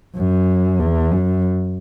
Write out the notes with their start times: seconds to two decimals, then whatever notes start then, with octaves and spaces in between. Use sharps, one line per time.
0.16 F#2
0.79 E2
1.11 F#2